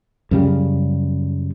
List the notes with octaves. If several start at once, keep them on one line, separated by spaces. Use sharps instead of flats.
F#2 C#3 G3